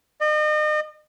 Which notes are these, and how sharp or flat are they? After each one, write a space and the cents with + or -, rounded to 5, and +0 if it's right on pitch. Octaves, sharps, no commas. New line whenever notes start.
D#5 -40